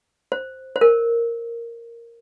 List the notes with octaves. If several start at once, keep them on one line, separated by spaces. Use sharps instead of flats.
C5
C5
A#4